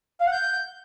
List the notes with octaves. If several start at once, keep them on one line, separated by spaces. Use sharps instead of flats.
F5
F#5
G6